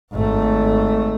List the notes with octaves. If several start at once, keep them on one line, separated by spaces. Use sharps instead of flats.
G#1 A3